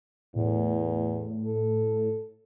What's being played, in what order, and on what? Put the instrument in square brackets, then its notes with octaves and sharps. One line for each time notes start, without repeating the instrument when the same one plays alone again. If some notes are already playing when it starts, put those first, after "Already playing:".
[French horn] E2 [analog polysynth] A2
[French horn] A4